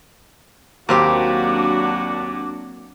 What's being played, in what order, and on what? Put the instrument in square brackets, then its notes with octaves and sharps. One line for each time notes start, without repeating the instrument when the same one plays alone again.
[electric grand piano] D#2 [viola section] F#3 D4 F#4 [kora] A#3 C4 G4 [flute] D6